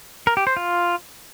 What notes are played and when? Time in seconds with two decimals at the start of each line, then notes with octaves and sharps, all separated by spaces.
0.27 A#4
0.37 G4
0.47 C5
0.57 F4